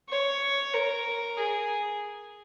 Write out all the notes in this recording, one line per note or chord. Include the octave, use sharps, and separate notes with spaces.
C#5
A#4
G#4